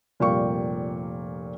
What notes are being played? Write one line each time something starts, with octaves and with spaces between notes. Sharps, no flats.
F1 A#2 G3 F5 G5 C#6